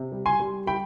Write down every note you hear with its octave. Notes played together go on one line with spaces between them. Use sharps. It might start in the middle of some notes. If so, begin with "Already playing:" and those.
Already playing: C3
G3
G#5 C6
G3
G3 G5 B5